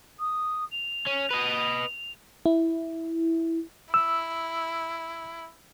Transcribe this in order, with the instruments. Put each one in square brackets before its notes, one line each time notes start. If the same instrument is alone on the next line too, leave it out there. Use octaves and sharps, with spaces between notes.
[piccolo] D#6
F7
[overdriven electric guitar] C#4
B4 D#5
[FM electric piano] E4
[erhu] E4 [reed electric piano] E6